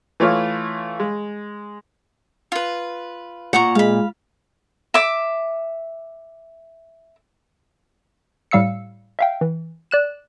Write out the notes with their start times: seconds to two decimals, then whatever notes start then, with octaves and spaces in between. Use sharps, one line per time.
0.20 E3 A3 F4 C#5 F6
1.00 G#3
2.52 F4 B4
3.53 A#2 F#5 A#5 C#6
3.75 G#3 F5 B5
4.94 E5 D6
8.51 A2 G3 F5 E6 C#7
9.19 E5 F5 G5
9.41 E3
9.91 D5 F#6 E7